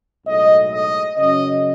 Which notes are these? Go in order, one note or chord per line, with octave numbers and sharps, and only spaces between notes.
B1 A2 G#3 D#5
D#5
F#2 C#3 F#3 D#5